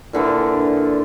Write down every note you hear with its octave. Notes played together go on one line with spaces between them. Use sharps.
A#2 D3 E3 F4